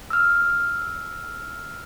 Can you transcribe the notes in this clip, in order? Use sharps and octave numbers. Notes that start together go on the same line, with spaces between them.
E6 F6